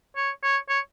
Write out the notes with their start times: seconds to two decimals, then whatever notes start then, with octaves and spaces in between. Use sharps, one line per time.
0.16 C#5
0.43 C#5
0.69 C#5